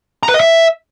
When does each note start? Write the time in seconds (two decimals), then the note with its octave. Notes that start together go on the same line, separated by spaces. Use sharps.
0.23 A#5
0.29 B4
0.34 D#5
0.40 E5